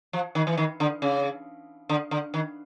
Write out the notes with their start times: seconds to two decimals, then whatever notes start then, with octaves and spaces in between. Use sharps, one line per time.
0.13 F3
0.35 D#3
0.47 E3
0.57 D#3
0.80 D3
1.02 C#3
1.89 D3
2.11 D3
2.34 D#3